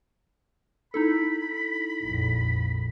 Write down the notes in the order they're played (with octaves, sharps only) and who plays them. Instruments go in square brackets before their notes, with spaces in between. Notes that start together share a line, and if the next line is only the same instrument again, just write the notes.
[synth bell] D#4 E4 A4 [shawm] B5
[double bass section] A#1 F2